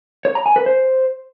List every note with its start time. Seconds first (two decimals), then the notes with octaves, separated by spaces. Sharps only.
0.25 C#5
0.35 A#5
0.46 G#5
0.56 B4
0.66 C5